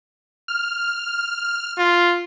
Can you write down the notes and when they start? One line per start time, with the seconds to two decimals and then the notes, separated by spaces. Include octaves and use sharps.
0.48 F6
1.79 F4